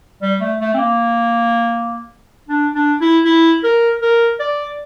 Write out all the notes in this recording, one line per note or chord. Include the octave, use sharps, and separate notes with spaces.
G3
A3
A3
C4
A#3
D4
D4
E4
E4
A#4
A#4
D5